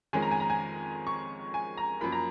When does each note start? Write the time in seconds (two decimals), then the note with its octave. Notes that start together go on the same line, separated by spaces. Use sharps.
0.13 F2 D#3 G#3 C#4 G#5
0.22 A#5
0.31 G#5
0.40 A#5
0.50 G#5
1.07 C#6
1.54 G#5
1.77 A#5
2.01 F#2 F3 A#3 B5
2.12 A#5